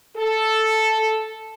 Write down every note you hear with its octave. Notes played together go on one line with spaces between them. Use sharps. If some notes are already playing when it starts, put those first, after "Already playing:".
A4